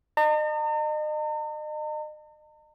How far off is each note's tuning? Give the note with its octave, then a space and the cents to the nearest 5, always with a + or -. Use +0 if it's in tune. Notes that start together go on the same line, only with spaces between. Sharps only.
D#5 -35 A#5 -45